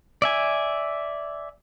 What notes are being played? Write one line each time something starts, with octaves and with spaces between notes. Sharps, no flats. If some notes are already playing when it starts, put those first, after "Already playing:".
D5 E5 G#5